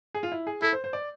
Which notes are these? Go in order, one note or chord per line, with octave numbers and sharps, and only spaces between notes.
G#4
F4
E4
G#4
E4 A4
C5
C5
D5